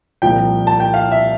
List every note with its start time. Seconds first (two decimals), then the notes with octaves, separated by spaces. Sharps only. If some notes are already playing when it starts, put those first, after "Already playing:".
0.22 C2 A#2 F3 G5
0.67 A5
0.80 G5
0.94 F5
1.12 E5